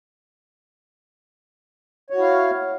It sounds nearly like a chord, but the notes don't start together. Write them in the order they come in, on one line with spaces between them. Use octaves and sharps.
C#5 F#4 E4 F5